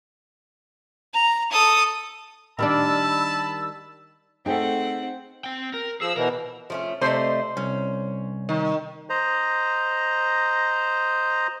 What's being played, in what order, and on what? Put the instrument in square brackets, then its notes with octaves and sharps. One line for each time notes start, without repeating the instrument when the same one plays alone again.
[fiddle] A#5
A4 D#6
[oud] D#3 G3 D4 [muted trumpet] A5 [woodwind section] B5 E6
[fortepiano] A3 G5 [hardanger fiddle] C4 F#5 [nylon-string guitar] D#4 G#4
[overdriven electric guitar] C4 G5
A#4
[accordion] F3 E6 [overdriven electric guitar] G#4
[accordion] B2 E3 [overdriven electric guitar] A#4
[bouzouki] F3 A3 C#4
[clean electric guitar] C3 A3 [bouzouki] D#4 D5 [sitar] C5
[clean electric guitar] C2 [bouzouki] C#4
[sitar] D#3
[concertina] C5 D#5 A#5